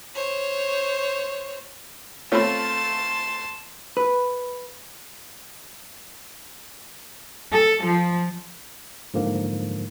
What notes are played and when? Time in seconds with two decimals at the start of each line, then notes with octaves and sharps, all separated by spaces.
0.15 C5 C#5
2.32 A3 C4 F4 C#5 F5 A5 B5 C6
3.97 B4
7.52 A4
7.83 F3
9.14 G#2 D3 F3 A#3